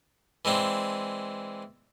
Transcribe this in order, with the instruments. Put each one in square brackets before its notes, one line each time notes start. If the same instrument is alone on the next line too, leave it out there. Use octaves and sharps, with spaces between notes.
[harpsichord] E3 G#3 C4 D4